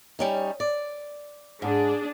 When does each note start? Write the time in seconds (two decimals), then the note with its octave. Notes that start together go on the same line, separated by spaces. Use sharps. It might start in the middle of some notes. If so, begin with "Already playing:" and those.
0.19 G3 C#4 D#4
0.60 D5
1.62 G#2 D4 G#4